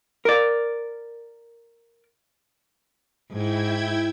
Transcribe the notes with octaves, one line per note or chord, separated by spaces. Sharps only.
A#4 D5
G#2 E4 G5 G#6